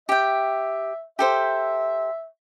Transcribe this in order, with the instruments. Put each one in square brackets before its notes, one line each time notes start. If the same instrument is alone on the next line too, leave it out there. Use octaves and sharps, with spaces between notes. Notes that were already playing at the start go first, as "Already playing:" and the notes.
[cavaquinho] G4 G5 [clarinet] E5
[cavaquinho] G4 A4 C5 [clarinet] E5